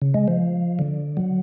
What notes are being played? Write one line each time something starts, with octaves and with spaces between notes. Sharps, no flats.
C#3
G#3
F3
D3
F#3